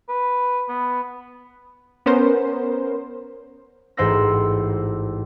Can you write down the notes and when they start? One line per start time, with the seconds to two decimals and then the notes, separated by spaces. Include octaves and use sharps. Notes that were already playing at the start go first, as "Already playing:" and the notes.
0.09 B4
0.69 B3
2.06 B3 C#4 A#4 C5
3.97 A1 G#2 C5 F#5 E6 A#6